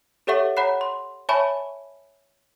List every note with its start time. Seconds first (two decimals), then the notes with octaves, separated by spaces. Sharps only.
0.27 G4 A4 C#5 E5 F#5 C#6
0.57 C#5 F#5 A#5 B5 F#6 C7
0.81 C6
1.29 C#5 E5 G#5 A5 B5 C#6